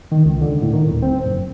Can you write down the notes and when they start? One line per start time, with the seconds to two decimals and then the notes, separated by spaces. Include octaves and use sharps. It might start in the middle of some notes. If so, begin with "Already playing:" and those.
0.12 D#3
0.25 C#2
0.41 D3
0.62 A2
0.73 D#3
0.89 D#1
1.02 C4
1.25 F#1